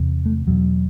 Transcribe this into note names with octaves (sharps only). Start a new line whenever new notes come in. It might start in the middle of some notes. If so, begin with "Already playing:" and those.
Already playing: E2 C3
A3
E2 B2 F#3